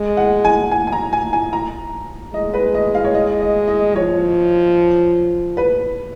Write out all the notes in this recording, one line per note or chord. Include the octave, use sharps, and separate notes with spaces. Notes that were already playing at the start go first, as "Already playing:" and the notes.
Already playing: G#3
F#5
G#5
G#5
G#5
A#5
G#5
G#5
A#5
G#3 D#5
B4
D#5
F5
C#5
D#5
D#5
D#5
F3 C#5
B4